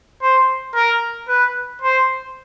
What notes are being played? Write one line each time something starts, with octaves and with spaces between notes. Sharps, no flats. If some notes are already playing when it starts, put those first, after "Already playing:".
C5
A#4
B4
C5